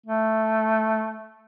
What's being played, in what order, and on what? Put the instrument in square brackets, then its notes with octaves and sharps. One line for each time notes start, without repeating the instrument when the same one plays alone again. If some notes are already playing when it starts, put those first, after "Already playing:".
[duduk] A3